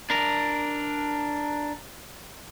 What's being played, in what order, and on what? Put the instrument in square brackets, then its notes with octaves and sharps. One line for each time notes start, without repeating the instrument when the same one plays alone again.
[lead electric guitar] D4 A#4